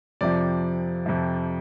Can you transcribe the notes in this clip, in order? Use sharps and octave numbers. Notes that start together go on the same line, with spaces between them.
F2 C3 F3 D5
F2 C3 F3